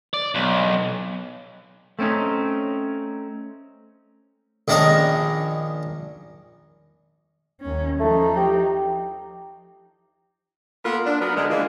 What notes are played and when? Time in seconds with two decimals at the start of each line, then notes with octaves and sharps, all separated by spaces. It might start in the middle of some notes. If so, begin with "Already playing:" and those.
0.14 D5
0.35 B1
1.99 A3 C4 C#4 D#4
4.68 A#1 D#3 C#4 D4 D#5 A#5
7.61 D#2 C#4
8.00 F3 A3 D#4
8.36 G4
10.85 A#3 B3 F4 A4 A#4
11.06 D4
11.21 F#3 B3 A#4
11.37 D3 G#3
11.50 E3 F3 G#3 A#3 D4 F4